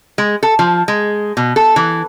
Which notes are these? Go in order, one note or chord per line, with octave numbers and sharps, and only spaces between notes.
G#3
A4
F3
G#3
B2
A4
E3